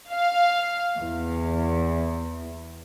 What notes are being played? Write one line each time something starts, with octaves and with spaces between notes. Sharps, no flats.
F5
E2